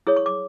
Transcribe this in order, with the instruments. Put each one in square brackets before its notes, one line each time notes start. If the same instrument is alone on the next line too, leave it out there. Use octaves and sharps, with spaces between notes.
[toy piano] E4 G#4 C#5 D#6
C#6
D6